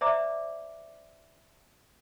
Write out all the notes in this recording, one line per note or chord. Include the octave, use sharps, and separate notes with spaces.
C5 D5 E5 A#5 D6